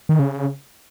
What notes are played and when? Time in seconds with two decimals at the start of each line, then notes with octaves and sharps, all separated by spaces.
0.09 D#3
0.19 C#3